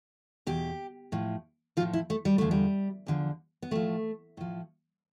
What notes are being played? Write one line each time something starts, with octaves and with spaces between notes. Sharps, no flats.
E2 B2 G4
A2 F3
A2 F3 F4
E4
A3
G3
E2 D3 F3 A3
G3
E2 D3 F3
B3
A2 F3 A3
A2 F3